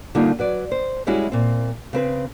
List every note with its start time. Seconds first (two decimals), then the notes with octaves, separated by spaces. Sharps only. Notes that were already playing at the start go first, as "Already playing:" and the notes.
0.15 D3 G3 A#3 D#4 F4
0.39 F#3 B4 D5
0.72 C5
1.07 G3 G#3 C#4 E4 F#4 G#4
1.32 A#2 C4
1.93 C#3 C4 B4